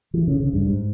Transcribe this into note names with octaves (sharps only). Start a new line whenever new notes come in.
E3
C#3
C#3
G2
G#2